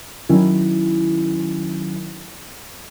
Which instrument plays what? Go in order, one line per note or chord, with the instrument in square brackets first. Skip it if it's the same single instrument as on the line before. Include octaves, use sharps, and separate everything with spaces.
[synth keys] D#3 F#3 C#4 E4